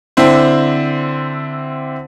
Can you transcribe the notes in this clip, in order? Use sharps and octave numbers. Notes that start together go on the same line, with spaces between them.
D3 C4 D4 E4 C5